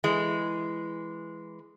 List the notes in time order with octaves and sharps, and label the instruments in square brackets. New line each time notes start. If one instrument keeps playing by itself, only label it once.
[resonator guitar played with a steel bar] E3 G#3